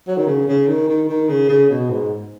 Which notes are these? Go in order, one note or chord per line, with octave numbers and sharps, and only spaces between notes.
F#3
D#3
C#3
C#3
D#3
D#3
D#3
C#3
C#3
B2
G#2